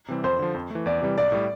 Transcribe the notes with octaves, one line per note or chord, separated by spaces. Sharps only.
C3 E3 G3 C4
F2 C5
D3 F3
F2
E3 A3
E2 D5
C3 E3 G3
B1 D5
A2 G3